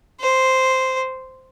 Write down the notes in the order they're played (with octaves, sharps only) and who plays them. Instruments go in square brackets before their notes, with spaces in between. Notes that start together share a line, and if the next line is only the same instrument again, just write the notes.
[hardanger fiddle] C5